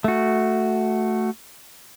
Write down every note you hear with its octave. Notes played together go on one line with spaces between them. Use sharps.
A3 F#4